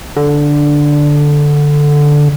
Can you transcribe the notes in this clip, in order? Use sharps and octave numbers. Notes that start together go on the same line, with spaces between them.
D3